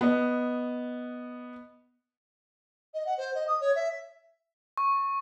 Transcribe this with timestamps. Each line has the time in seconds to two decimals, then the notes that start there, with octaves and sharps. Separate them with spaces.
0.01 B3 D#5
2.94 D#5
3.05 F#5
3.17 C5
3.34 D#5
3.47 D#6
3.60 C#5
3.75 E5
4.77 C#6